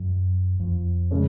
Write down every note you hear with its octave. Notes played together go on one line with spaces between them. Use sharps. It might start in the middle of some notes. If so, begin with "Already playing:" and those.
Already playing: F#2
F2
C#3 G#3 C#4